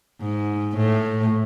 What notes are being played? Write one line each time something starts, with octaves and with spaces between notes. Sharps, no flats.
G#2
A2